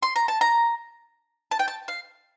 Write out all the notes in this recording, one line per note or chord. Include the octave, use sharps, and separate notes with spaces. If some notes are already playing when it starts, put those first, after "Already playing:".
C6
A#5
A5
A#5
A5
G5
A5
F5